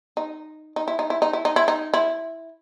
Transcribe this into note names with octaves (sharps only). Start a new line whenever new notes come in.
D#4
D#4
E4
D#4
E4
D#4
E4
D#4
E4
D#4
E4